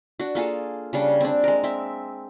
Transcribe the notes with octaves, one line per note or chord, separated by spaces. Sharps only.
D4 F#4
A#3 F4 G#4 A4
C#3 G3 D4
C4 D4
G#3 A#4
C4 E5